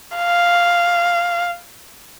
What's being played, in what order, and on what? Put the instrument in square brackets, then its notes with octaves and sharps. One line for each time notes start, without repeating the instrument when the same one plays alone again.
[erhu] F5